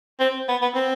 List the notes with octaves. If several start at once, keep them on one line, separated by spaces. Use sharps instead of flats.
C4
B3
B3
C4